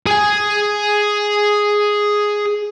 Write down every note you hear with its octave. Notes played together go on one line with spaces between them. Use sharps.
G#4 G#5